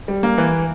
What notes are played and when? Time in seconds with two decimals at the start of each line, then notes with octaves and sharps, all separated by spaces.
0.08 G3
0.23 A#3
0.38 E3